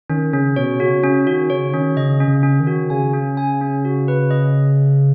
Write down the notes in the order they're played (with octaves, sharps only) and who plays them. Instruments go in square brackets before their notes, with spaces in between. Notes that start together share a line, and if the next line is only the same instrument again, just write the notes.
[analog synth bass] D#3 [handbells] C#4
[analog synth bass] C#3 [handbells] C#4
[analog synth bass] B2 [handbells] C#5
[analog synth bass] C#3 [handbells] F#4
[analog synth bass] C#3 [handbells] C#4
[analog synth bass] D#3 [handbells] F#4
[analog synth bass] C#3 [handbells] C#5
[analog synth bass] D#3 [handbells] C#4
[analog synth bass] C#3 [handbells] D#5
[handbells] C#4
[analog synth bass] C#3
[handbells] C#4
[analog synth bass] D#3
[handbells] F#4
[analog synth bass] C#3 [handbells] G#5
[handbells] C#4
G#5
C#4
F#4
B4
D#5